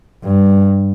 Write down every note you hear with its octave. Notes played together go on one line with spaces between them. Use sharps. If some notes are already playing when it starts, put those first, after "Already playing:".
G2